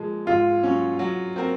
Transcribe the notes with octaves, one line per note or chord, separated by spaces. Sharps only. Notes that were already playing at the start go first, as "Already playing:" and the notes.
Already playing: A#2 F3 G#3
G#2 F4
F#3 C#4
F#3
C4 F#4 A#4